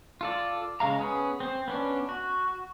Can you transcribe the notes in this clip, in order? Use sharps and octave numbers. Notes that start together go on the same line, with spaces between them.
F4 A4 D5
C#3 G#3 F5 A#5
B3 C#4 G#4
C4 C5
B3 C#4 D4
F#4